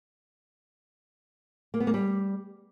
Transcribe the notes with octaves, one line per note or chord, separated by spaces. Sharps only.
A#3
B3
A#3
G3